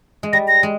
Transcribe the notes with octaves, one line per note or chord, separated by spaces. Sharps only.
G#3
G3 A#6
A#6
G#3